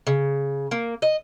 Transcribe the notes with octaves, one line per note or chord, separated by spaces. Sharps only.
C#3
A#3
D#5